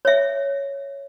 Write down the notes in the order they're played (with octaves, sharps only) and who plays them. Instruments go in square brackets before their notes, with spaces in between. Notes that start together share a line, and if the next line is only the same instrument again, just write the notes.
[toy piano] C#5 E5